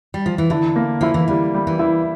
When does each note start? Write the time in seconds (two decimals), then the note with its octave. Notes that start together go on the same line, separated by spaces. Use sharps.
0.14 G3
0.26 F3
0.38 E3
0.50 D3 E4
0.76 A#3
1.01 F3 E4
1.14 E3
1.28 D3 G3
1.54 G3
1.67 E3
1.79 E4